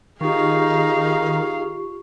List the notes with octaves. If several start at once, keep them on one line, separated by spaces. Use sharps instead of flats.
D#3 D#4 F4 G4 G#4 F5 C#6